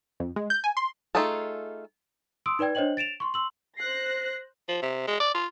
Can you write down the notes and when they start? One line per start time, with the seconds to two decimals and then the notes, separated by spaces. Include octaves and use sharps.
0.20 F2
0.36 G#3
0.50 G6
0.64 G#5
0.77 C6
1.15 A3 D#4 F4 G#4 A4
2.46 C6 D#6 E6 D7
2.59 D#4 B4 D5 G5 G#6
2.75 D4 C5 C#5 D#5 G5 F#7
2.97 A6 D7 E7 F7
3.20 C6 C#6
3.34 C6 E6 F#7
3.77 C5 F#6 A#6 C7
4.68 F3
4.82 C3
5.07 G#3
5.20 D5
5.35 F4